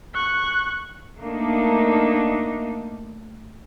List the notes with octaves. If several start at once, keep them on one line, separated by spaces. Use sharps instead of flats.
C#6 F#6
A3 A#3 D4 D#4